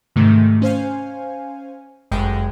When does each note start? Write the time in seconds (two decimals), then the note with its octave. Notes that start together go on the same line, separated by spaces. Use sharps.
0.16 G#2 C3 D#3 A3
0.62 C#4 C5 F5 G#5
2.11 G1 F#2 G#3 G5